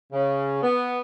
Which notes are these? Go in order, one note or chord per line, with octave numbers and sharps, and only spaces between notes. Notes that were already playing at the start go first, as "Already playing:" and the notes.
C#3
B3